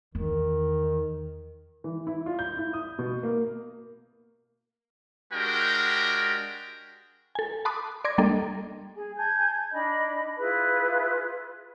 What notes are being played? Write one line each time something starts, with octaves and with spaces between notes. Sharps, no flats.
E2 D#3
E3
E4
F4
G6
E4
D#6
B2
A#3
G#3 D4 F#4 G4 A#4 G5
A4 G#5
A5 B5 C6 D6 D#6 F#6
D5 C6 D6 G#6 A#6
G3 A#3 D4 A4 D#5
G#4 G#5
G#5 A5 G6 G#6
D4 D#4 D#5 B5
E4 F4 G#4 B4